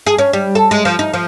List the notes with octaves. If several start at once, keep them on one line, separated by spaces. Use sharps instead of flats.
G#4
C#4
G3
A4
G#3
F3
D#4
F3